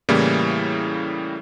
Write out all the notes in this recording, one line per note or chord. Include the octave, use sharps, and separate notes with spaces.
A2 C#3 E3 G3 A#3